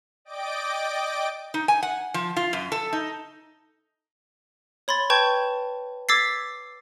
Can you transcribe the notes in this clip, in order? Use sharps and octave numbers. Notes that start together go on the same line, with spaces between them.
D5 D#5 G5 D6 D7
D#4
G#5
F#5
F3
F4
F#2
A4
D#4
C#5 B5 C6 A6
B4 G5 A5 C#6 G6 G#6
D6 E6 G#6 A6 B6 C7